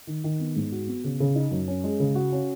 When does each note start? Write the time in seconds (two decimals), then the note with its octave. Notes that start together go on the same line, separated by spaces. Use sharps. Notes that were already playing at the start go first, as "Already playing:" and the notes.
0.07 D#3
0.24 D#3
0.39 B3
0.56 G#2
0.72 F#4
0.87 B3
1.04 C#3
1.20 C#3
1.35 D#4
1.51 F#2
1.68 C#4
1.84 G#3
2.00 C#3
2.15 F#4
2.32 C#4